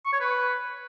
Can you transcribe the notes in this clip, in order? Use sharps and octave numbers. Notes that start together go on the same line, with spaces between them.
C#6
C#5
B4